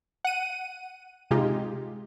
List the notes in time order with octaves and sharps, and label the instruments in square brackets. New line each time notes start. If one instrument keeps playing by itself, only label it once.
[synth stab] F#5 D#7
C3 G#3 D#4 F4 G4